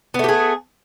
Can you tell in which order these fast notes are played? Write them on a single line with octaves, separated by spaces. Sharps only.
B3 A3 G4 G#4